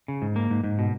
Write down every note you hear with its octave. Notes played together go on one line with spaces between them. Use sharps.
C#3
G#2
A#3
G#2
G#2
B2